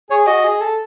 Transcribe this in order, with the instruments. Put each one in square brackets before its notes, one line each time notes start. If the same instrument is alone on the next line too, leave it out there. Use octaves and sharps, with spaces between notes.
[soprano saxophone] G#4 [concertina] C#5
[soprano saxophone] F#4 [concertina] D#5
[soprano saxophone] G#4
A4